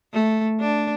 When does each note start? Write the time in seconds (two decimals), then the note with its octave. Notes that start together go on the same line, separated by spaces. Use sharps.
0.13 A3
0.60 D4